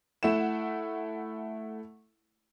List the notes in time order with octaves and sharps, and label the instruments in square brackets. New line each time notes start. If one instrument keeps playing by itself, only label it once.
[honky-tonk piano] A3 E4 F#5 E7